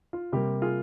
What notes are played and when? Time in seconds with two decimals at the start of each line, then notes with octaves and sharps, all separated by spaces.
0.13 F4
0.32 C3 G3 A#3 G4
0.62 F4 G#4